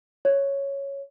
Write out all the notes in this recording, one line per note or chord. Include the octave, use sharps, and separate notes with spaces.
C#5